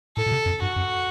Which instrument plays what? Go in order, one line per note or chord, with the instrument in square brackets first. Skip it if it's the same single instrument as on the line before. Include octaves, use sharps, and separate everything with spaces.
[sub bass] A2 [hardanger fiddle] A4
[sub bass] A#2
C3
F#2
[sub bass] G2 [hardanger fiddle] F#4
[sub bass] F#2